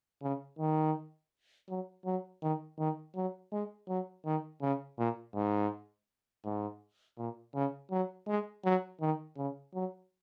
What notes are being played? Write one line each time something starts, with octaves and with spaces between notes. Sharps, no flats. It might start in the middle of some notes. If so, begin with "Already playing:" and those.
C#3
D#3
F#3
F#3
D#3
D#3
F#3
G#3
F#3
D#3
C#3
A#2
G#2
G#2
A#2
C#3
F#3
G#3
F#3
D#3
C#3
F#3